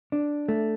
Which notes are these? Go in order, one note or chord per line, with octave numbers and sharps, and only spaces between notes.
D4
A3